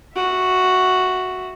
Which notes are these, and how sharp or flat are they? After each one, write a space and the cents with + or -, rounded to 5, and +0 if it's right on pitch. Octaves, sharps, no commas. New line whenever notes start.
F#4 +0 E5 +0